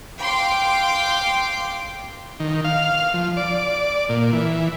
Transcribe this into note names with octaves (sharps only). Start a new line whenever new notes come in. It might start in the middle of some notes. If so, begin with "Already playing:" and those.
F5 G5 C6 D6
D#3
F5
F3
D5
A#2
E3